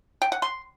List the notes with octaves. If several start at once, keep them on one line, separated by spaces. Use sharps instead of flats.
G5
F#5
C6